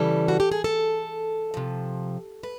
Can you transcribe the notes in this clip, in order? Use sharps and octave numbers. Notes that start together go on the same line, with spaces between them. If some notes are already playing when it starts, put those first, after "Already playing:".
Already playing: C#3 E3 G3 A4
F#4
G4
G#4
A4
C3 F3
B4